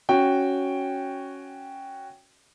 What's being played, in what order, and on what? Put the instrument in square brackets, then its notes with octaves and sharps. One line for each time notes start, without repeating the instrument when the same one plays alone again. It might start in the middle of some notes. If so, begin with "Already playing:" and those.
[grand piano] C#4 F#4 G5